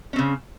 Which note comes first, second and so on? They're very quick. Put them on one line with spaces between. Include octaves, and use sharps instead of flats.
C#4 C4 C#3